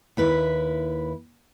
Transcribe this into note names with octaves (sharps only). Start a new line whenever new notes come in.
D#2 E4 B4